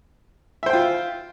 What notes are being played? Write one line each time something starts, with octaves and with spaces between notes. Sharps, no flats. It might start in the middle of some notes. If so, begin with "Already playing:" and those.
F4 C5 E5 G5